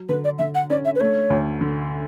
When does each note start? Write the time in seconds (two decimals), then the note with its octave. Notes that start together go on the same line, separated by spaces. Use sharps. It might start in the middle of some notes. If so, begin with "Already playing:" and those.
Already playing: F#3
0.09 D3 B4
0.24 D5
0.39 D3 E5
0.55 F#5
0.70 C#4 D5
0.85 E5
0.95 B4
1.00 A3 C#5
1.30 D2
1.61 D3